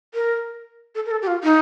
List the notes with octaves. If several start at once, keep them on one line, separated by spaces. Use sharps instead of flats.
A#4
A4
A#4
A4
G4
F4
D#4